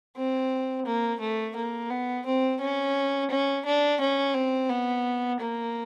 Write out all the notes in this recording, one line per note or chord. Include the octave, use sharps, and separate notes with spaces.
C4
A#3
A3
A#3
B3
C4
C#4
C#4
D4
C#4
C4
B3
A#3